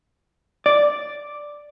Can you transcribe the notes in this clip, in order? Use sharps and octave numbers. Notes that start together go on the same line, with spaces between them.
D5